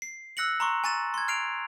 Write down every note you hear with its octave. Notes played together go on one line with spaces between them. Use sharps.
C7
E6 F#6 A#6 C#7 F#7
A#5 C6 C#6
G#5 C#6 A6 E7
C6 G#6
F6 C7 D7 F7